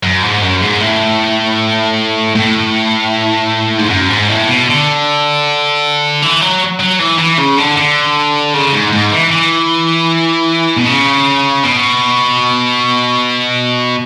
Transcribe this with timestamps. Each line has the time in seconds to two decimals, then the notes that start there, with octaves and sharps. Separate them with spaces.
0.03 F#2
0.22 G#2
0.42 F#2
0.62 G#2
0.80 A2
2.35 A2
3.78 G#2
3.90 F#2
4.09 G#2
4.29 A2
4.48 B2
4.67 D3
6.22 E3
6.41 F#3
6.80 F#3
6.99 E3
7.19 E3
7.38 C#3
7.58 D3
7.77 D3
8.54 C#3
8.73 G#2
8.93 G#2
9.12 E3
9.31 E3
10.77 B2
10.86 C#3
11.63 B2